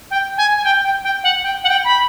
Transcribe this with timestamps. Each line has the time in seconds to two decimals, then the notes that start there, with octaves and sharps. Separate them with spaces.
0.10 G5
0.37 G#5
0.57 G#5
0.64 G5
0.83 G5
1.03 G5
1.23 F#5
1.43 G5
1.63 F#5
1.69 G5
1.84 B5